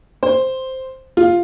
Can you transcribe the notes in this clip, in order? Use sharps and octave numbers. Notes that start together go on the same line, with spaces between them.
C5
F4